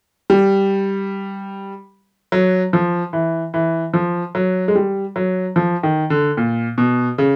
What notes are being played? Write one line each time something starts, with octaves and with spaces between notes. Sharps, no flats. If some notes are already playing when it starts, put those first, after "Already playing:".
G3
F#3
F3
E3
E3
F3
F#3
G#3
G3
F#3
F3
D#3
D3
A#2
B2
C#3